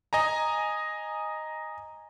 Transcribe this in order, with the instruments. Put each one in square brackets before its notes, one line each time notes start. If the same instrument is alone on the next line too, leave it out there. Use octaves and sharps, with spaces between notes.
[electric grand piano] D#5 G#5 A#5